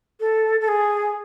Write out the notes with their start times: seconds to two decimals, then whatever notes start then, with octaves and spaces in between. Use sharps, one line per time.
0.20 A4
0.60 A4
0.68 G#4